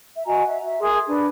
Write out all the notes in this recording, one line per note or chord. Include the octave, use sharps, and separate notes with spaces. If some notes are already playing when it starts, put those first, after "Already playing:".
E5
F#4 D#5 G#5 A#5
E5
E5
G#4 A#4 C6 D#6
D4 B4